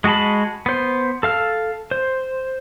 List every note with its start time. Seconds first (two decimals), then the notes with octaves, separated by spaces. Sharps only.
0.04 G#3 F#4 G#4 A5 B5
0.66 B3 C5
1.23 A4 F5 F6
1.91 C5